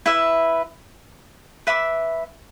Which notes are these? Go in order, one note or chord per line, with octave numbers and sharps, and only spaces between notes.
E4 B4 E5
B4 E5 B5 D6